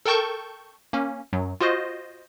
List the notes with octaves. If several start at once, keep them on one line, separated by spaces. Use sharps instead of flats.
A4 A#4 G5 A5 C#6 G6
A#3 C#4
F#2 F#3
F4 F#4 C5 D#5